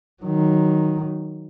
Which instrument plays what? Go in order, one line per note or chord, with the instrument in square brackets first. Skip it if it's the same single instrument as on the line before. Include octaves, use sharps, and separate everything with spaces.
[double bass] D#3 F#3